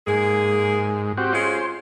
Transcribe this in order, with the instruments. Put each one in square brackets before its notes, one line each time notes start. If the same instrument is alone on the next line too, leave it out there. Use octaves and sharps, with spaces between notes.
[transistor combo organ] G#2 [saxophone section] A#3 G#4
[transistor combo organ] C4 F#4 G4
[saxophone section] G#3 C#4 F4 [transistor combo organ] C5